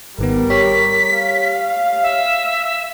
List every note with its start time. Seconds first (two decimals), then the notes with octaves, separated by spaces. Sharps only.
0.19 G#1 D#3 G3 B3 A#4
0.50 G4 C#5 B6
1.14 F5
2.03 E5